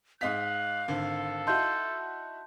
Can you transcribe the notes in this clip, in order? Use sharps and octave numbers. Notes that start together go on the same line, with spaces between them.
G#2 D#5 F5 F#6 B6
G#1 D3 A4
D#4 E4 F#4 A5 C6 G6